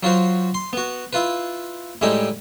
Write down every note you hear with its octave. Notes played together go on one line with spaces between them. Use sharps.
F#3 F4 F#4 C5
C6
B3 F#4
E4 F4 B4
A2 G3 G#3 D#4 E4 G4